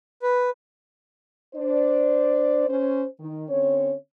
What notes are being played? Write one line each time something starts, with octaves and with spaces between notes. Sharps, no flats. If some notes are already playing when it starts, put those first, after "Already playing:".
B4
D4 C5 D5
C#4 C5
D#3
D3 C4 C#4 C#5